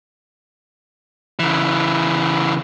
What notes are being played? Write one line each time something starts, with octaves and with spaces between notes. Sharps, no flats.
C#3 E3